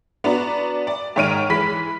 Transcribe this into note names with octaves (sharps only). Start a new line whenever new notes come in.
B3 D4 F#4 A#5
D5
G#2 D#3 C#5 F6 D7 D#7
E3 G#3 B5 B6